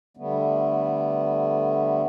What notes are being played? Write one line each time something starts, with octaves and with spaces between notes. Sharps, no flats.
D3 G3 A3 B3